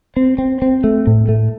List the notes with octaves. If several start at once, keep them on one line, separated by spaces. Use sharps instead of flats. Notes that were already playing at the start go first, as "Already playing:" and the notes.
C4
C4
C4
A3
A2
A3